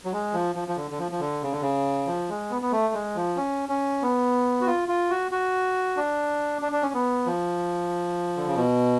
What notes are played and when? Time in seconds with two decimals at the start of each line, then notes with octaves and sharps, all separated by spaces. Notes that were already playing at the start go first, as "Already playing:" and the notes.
0.05 F#3
0.13 G#3
0.33 F3
0.55 F3
0.68 F3
0.77 D3
0.91 D3
0.99 F3
1.12 F3
1.20 D3
1.43 C#3
1.52 D3
1.62 C#3
2.07 F3
2.29 G#3
2.50 B3
2.62 B3
2.72 A3
2.94 G#3
3.15 F3
3.37 C#4
3.69 C#4
4.02 B3
4.61 F#4
4.67 F4
4.88 F4
5.10 F#4
5.31 F#4
5.97 D4
6.62 D4
6.72 D4
6.82 C#4
6.94 B3
7.26 F3
8.37 D3
8.46 C#3
8.56 B2